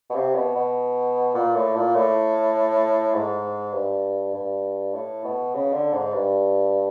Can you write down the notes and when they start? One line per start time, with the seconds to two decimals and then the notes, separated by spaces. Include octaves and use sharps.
0.10 B2
0.15 C3
0.35 B2
0.55 B2
1.35 A#2
1.55 A2
1.75 A#2
1.95 A2
3.14 G#2
3.74 G2
4.34 G2
4.94 A2
5.24 B2
5.55 C#3
5.74 D3
5.93 G#2
6.14 G2